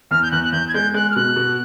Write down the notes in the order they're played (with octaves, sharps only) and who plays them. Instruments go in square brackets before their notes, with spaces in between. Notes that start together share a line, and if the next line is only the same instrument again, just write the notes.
[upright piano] E2 [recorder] F6
[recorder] G6
[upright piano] E2 [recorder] F#6
[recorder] F#6
[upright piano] E2 [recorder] G6
[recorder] G#6
[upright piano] G#3 [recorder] G6
[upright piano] G#3 [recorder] F#6
[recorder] F6
[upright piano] B2 [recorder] F#6
[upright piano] B2